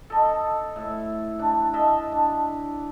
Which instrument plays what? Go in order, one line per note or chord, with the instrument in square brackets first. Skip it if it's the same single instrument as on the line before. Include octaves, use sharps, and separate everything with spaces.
[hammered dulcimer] A4 D#5
A2 E5
D4
D#5 E5 A5
D4